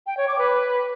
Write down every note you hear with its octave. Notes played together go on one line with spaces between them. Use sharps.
G5
C#5
D6
B4